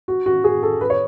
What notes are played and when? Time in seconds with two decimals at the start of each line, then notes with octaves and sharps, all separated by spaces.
0.08 F#4
0.26 F#4
0.44 G#4
0.63 A4
0.81 B4
0.90 C#5